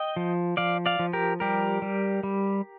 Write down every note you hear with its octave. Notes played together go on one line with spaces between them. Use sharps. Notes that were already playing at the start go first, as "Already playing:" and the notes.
Already playing: D#5 G5
F3
F3 D5 F5
D5 F5
F3
G4 A#4
G3 G4 A#4
G3
G3